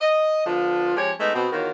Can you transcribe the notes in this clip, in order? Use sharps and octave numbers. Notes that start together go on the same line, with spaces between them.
D#5
D3 F3 B3 F4
F3 G#3 C#4 G4 C#5
G#3 A3 B3 D#4
B2 C4
E2 D#3 F4 F#4 A#4 C#5